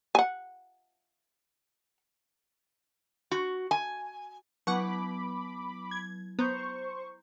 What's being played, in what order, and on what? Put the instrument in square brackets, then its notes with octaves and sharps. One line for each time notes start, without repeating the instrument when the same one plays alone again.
[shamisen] F#5 G#5
[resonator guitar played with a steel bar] F#4
G#5
[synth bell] F#3 [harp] B3 E4 [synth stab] F#5 C#6 [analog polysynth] B5 D6
[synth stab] G#6
[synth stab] B3 [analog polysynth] C5 C#6 [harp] A#5 C6 G6